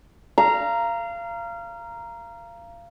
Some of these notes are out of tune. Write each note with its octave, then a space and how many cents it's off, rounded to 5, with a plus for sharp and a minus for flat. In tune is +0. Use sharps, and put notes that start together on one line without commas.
F5 -25 A#5 +0